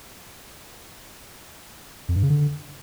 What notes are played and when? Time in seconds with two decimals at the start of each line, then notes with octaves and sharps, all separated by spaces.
2.09 F2
2.16 G2
2.23 C#3
2.30 D3